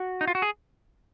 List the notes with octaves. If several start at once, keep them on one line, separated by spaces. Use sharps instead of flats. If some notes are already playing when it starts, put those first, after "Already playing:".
Already playing: F#4
D#4
F4
F#4
G#4